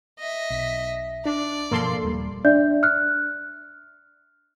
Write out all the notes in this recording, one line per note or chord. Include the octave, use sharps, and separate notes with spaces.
D#5 E5
B1 B6
D4 D5
G2 B2 F3 A#3 A4 C6
D#1 G3
D4 D5 E5 G6
F6 F#6